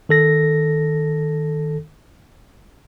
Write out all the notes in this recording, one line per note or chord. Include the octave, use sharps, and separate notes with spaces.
D#3 A4 A#6